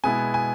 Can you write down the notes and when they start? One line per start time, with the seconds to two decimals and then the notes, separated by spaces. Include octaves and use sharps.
0.04 B2 G#3 B3 E4 G#5
0.34 G#5